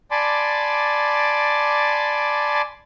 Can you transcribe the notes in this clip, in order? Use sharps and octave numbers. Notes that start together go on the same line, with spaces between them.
D5 G#5 A5 B5 C6 D6